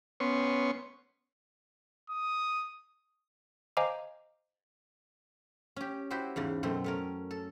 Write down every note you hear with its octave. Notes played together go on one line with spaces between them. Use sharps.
B3 C#4 C6 C#6
D#6
C5 D#5 F5 G#5 A#5 D6
C#4 G4
E4 F#4 G4 C5 E5
E2 G#2 C#3
F#2 B2 A3 C4
A3 C#4 A#4
A4